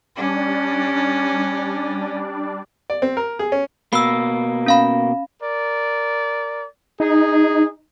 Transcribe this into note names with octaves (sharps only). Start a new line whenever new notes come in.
G3 C#4 D4 D5
D5
C4
A#4
G#4
C#4
B2 A#3 B5 E6
C#4 F5 B5
A#4 D5
D#4 G#4